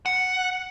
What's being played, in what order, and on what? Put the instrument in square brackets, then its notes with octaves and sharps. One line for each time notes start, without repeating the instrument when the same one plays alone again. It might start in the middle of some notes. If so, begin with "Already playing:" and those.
[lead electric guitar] F#5